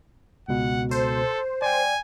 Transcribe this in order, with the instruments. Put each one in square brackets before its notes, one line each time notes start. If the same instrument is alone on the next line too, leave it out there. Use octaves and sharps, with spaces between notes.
[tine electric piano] C#2 B2 [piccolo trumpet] F#5
[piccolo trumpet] A4 [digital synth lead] C5
[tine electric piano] D5 G5 [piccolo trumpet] G#5